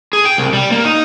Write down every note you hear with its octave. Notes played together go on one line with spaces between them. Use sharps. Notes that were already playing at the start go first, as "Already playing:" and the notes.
G#4
G5
C2
G3
A#3
D#4